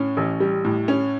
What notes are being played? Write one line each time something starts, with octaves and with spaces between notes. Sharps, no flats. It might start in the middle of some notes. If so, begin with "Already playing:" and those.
Already playing: A2 C#4
A1
G3
A2
C#4